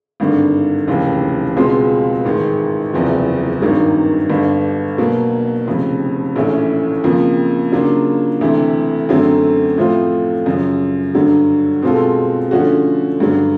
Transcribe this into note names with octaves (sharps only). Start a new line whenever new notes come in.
G#1 G2 D3
F1 D#2 C#3 E3
C#2 B2 G#3 C4 F4
A1 G#2 D#3 G#3
F#1 E2 C3 F3
G#1 G2 D#3 F#3
G1 G2 D3
B2 F#3 A#3
F1 F2 C#3
A#1 A2 E3 A3 C#4
F2 C#3 F3 A#3
C#3 F#3 A#3 D4 F4
D2 C3 E3 A3
F#2 D3 F#3 A3 C4
A2 F3 A3 C4 F4
F#2 C#3 F3
G2 D3 F#3
B2 G#3 C4 F4 A4
D3 F3 A3 C#4 F#4
G2 D3 F#3